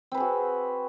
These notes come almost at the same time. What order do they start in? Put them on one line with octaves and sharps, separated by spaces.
C4 B4 G#4 F#4